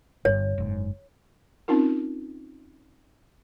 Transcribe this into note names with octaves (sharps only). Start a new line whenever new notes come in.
G1 G2 C#5
F#1 G#2
C4 C#4 D#4 F4 A#4